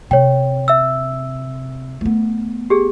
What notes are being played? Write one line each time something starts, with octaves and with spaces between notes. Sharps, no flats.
C3 C#5 G5
E5 E6
A3 B3
G4 G#4